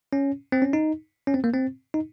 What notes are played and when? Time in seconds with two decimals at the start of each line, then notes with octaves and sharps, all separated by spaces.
0.13 C#4
0.52 C4
0.62 C#4
0.73 D#4
1.27 C#4
1.34 C4
1.44 A#3
1.54 C4
1.94 D#4